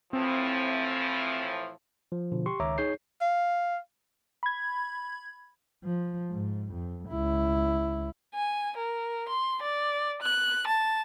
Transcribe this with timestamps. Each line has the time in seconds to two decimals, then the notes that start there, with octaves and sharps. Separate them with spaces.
0.13 A2 E3 F3 C4
2.12 F3
2.32 B2 D3 F3
2.46 G4 C6 C#6
2.60 C#2 D#3 C#5 E5 A#5 D6
2.78 D#4 G#4 C#5 G6 C7
3.21 F5
4.43 B5 G#6
5.84 F3
6.31 G#2
6.73 F2
7.08 C#2 E4
8.34 G#5
8.77 A#4
9.29 C6
9.62 D5
10.22 F#6
10.67 A5